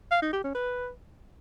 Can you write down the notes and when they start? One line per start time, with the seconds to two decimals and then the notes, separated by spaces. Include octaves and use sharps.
0.11 F5
0.22 D#4
0.33 G4
0.44 C#4
0.55 B4